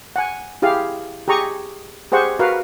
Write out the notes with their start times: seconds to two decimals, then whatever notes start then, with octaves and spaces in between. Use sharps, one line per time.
0.16 F#5 G#5
0.62 E4 G4 G#4 F5
1.28 G4 G#4 A#5 C#6 D#6
2.12 G4 G#4 C5 F#5 C#6
2.39 F#4 A#4 B4 F5 F#5